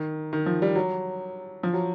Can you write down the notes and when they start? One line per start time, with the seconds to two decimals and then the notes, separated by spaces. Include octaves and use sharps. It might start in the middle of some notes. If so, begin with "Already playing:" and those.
Already playing: D#3
0.33 D#3
0.46 F3
0.62 G3
0.75 F#3
1.63 F3
1.73 F#3